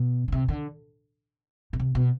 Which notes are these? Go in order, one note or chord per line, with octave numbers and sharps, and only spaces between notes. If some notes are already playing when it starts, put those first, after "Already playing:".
Already playing: B2
C#3
C3
D3
B2
C3
B2